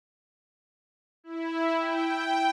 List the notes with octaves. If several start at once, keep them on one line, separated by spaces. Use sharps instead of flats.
E4
G5